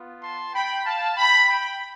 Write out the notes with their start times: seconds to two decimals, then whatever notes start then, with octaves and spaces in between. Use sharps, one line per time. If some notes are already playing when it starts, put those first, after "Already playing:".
Already playing: B3 F4
0.22 A5 C6
0.54 G5 B5
0.86 F5 A5
1.17 G5 B5
1.49 G5 B5